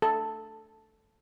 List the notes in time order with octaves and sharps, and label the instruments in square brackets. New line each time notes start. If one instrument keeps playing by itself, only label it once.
[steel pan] A4